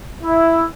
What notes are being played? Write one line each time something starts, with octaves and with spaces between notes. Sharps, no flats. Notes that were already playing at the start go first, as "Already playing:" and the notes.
E4